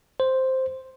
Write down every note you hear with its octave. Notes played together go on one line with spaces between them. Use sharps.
C5